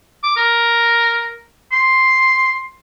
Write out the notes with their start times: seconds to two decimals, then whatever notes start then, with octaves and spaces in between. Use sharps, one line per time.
0.23 D6
0.37 A#4
1.72 C6